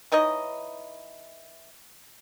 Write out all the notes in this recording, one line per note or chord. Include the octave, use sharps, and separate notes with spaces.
E3 D#4 C#5 D#5